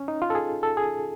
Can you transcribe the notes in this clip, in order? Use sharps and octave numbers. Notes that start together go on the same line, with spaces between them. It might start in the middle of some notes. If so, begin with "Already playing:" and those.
Already playing: C#4
D#4
F4
A4
G#4
A4
G#4